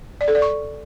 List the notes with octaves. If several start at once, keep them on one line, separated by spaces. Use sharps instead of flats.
D5
A4
D5
C#6